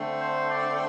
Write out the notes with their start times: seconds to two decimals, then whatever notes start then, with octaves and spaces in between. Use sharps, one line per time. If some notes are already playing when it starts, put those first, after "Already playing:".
Already playing: D3 A3 C4
0.18 C5
0.49 D5